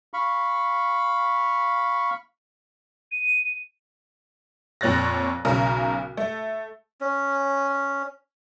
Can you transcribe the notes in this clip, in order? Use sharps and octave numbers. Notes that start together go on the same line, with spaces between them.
F5 B5 C#6
D#7
F2 A#2 C#5 F#6 A6 A#6
B1 C#3 A#4
A3
C#4